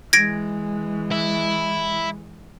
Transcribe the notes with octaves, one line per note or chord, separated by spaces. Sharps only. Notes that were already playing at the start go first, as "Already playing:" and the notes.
E3 G#3 G#6 A#6 D7
E4